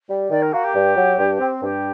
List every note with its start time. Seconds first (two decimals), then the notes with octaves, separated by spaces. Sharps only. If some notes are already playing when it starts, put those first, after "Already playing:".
0.09 G3
0.31 D#3 D5
0.42 A#4
0.52 A#3 F#4
0.64 G4
0.75 G2
0.96 F#3
1.18 G2
1.40 C4
1.62 G2 G4